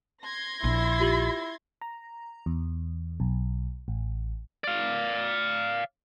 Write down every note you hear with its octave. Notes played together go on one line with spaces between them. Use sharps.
C6 G#6 A#6
A#1 E4
F4 G4 F#7
A#5
E2
B1
A1
D5 F5